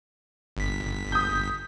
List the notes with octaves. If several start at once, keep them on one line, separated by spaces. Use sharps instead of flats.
G1 B6
D#6 G6